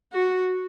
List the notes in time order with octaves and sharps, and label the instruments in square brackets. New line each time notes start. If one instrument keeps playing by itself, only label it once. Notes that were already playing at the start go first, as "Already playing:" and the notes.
[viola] F#4